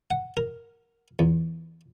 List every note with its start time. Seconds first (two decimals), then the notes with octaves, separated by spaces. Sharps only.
0.11 F#5
0.37 A#4
1.19 E2